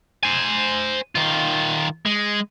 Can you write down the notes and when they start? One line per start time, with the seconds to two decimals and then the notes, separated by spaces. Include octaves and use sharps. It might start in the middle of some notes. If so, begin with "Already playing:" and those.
0.23 C5 G#5
1.15 D#3 F4
2.05 G#3